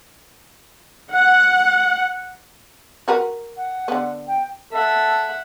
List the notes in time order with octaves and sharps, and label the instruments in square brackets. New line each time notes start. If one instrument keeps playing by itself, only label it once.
[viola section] F#5
[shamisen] F#4 A#4 B4
[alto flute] F#5
[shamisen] D3 B3
[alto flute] G5
[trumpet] A4 [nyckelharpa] E5 F#5